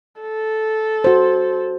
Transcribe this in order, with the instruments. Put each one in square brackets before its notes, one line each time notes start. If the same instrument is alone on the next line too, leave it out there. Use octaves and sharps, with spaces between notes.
[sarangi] A4
[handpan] F#4 C5